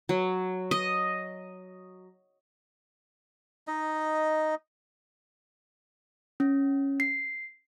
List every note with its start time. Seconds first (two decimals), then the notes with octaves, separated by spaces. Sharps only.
0.09 F#3
0.71 D#5
3.68 D#4 D#5
6.40 C#4
7.00 C7